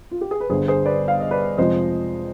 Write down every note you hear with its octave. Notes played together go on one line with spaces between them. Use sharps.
F4
G4
G#4
B4
G1 G2 D3 G#4 C5
G#4 C5
B4 D5
F5
D#5
B4 D5
F2 C3 F3 G#3 C5 D#5